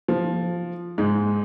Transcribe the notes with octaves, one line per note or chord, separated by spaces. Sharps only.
F3
G#2 G#3